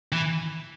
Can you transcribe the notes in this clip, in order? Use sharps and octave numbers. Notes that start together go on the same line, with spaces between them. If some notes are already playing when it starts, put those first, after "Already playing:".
E3